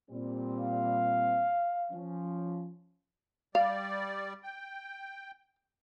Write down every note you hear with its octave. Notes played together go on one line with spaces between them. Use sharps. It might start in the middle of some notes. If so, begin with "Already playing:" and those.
A#2 G3 C4
F5
F3 C#4
G3 D5 F5
G5